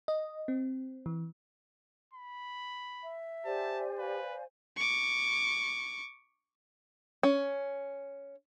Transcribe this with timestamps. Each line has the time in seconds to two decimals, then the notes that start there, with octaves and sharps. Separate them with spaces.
0.08 D#5
0.48 C4
1.06 E3
2.14 B5
3.03 E5
3.45 G4 C5 D5 G#5 A5
3.99 B4 F5
4.77 C#6 D6
7.23 C#4